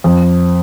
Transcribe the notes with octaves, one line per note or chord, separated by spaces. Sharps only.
F2